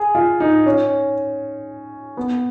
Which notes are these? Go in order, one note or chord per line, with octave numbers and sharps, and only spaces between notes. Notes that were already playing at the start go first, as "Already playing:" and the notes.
Already playing: G#4
F4
D#4
C#4
B3